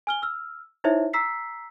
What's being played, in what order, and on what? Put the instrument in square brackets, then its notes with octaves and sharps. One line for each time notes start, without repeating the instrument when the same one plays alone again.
[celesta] G#5 F6 G7
E6 F6
D#4 E4 C5 C#5 E5
A#5 E6 B6 C7